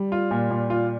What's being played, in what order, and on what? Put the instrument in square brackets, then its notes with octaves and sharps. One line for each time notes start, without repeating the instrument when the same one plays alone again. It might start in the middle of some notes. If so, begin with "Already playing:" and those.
Already playing: [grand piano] G3
[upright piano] F4
A#2
A#2
F4